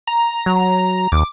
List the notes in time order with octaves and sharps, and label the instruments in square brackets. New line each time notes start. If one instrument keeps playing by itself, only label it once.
[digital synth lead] A#5
[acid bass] F#3
[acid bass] D#2 [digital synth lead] D6